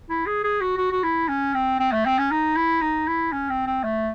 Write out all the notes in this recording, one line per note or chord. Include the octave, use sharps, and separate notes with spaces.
E4
G#4
G#4
F#4
F#4
F#4
E4
C#4
C4
C4
A3
C4
C#4
D#4
E4
D#4
E4
C#4
C4
C4
A3